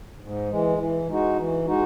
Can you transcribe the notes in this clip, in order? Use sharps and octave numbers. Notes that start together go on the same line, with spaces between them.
G#2
E3 G#3
E3
G#3 D#4 F#4
E3
G#3 D#4 F#4